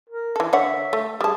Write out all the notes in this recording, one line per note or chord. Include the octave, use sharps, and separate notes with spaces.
A#4
E3 A4
D3 C#5 E5 F#5
A3
G3 G#4 A5